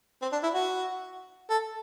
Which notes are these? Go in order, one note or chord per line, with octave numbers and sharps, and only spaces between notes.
C4
D4
E4
F#4
A4